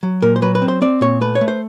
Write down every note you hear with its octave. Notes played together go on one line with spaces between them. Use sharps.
F#3
A#2 A#4
C5
F#3 B4
B4
C4
C5
C4 D5
A#2 C#5
A3 B4
C#5
A3
C5